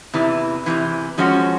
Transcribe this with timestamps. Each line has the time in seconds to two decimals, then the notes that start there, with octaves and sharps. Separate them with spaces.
0.13 E2 C3 E3
0.66 E2 C3 E3
1.18 F3 G#3 C#4 F#4